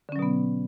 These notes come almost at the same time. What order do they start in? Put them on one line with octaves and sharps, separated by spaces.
D3 C#4 F#3 B2 B3